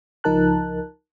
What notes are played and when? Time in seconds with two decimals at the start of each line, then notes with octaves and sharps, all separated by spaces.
0.24 C#2 F3 D#4 A#4 A5 F#6